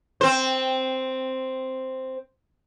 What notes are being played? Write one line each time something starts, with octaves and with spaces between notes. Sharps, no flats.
C4 C5